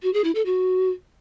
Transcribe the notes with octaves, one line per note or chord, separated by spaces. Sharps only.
F#4
G#4
E4
A4
F#4